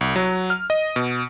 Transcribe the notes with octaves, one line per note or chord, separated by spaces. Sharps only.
C2
F#3
F6
D#5
B2